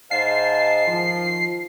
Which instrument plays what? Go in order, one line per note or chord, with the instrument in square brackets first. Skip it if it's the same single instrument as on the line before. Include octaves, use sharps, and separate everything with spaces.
[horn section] G#2 F5 A5 [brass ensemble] C5 D#5 [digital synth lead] C7
[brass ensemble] D#3 F3